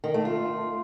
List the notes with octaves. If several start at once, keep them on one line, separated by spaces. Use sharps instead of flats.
D#3
A3
F4